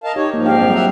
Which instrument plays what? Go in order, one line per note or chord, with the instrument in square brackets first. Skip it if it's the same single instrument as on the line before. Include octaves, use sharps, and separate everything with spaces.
[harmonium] A#4 F5 A5 [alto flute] D#5
[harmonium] D#4 C#5 [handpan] G4
[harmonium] G#2 F3 D#4 [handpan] A#3
[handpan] D4 G4 F5 [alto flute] G5
[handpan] F#3 G3 C4
[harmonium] E5 F#5 A#5